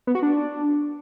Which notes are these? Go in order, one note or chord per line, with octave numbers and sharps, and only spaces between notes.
B3
F#4
D4